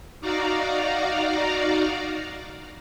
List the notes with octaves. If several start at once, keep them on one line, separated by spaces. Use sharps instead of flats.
D#4 F#4 D5 F5 A#5